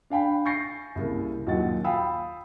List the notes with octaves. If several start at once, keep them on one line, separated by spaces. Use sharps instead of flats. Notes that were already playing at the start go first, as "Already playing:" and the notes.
D4 F5 G5 B5
G#5 C#6 G6 A6 A#6 C7
C2 C#3 A#3
D#2 A#2 F#3 D#4 F#5 A6
F5 G5 B5 D#6 E6